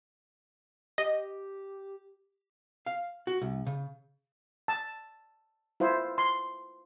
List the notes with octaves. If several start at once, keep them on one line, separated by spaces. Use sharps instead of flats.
G4 D#5
F5
F#4
C2
C#3
A5
E4 F4 C5
C6